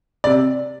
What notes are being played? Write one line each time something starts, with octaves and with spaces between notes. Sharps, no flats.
D5
C3